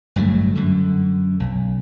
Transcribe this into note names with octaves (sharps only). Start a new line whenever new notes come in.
G1 G2 F#3 A3
F#2 D3
B1